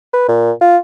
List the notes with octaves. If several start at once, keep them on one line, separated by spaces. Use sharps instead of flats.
B4
A#2
F4